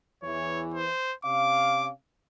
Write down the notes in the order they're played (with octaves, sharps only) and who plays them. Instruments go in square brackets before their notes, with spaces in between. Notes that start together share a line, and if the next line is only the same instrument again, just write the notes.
[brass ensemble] E2 E3 [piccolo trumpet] C#5
[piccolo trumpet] C5
[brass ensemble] C3 C#4 F5 [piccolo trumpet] D6